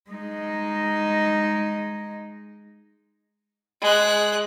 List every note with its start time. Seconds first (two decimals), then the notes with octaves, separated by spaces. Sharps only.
0.11 G#3 D#4
3.81 G#3 F#6